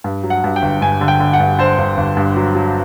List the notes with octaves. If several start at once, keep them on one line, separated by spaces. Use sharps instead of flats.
G2
F#3
F#5
G2
G5
G1
G2 G#5
D3
G5
D3
F#5
G2
D3 C5
G1
G1
G2
F#3
F#3